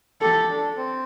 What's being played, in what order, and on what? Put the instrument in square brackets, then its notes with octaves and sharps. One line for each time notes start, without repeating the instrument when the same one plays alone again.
[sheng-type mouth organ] G4 [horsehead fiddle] A4
[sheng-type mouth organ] D4
C4